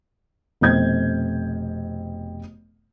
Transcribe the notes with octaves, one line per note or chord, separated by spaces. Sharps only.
F1 B2 C4 G6 G#6